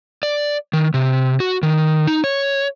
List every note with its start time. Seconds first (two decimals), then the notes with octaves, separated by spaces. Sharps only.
0.23 D5
0.73 D#3
0.94 C3
1.40 F#4
1.63 D#3
2.07 D#4
2.24 C#5